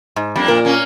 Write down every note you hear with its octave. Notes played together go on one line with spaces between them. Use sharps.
G#2
F2 G3 A#3 D4
A#2 A#4
A#3 C#4